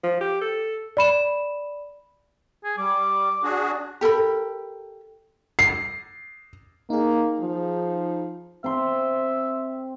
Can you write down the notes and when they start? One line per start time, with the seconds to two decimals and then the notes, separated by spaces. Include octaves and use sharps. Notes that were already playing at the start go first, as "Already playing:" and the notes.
0.04 F3
0.21 G4
0.41 A4
0.97 D5 B5 E7
2.64 G#4
2.78 G3 D6
3.43 D4 F#4 G#4
4.01 G4 A4 A#4 B5
5.59 C7
6.90 A#3 D#4 G#4
7.41 F3
8.64 C4 E5 C6